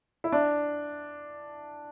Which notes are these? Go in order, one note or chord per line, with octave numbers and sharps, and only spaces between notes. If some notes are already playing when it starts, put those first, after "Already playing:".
E4
D4